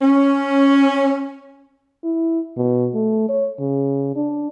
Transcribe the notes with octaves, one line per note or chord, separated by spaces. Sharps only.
C#4
E4
B2
A3
C#5
C#3
D4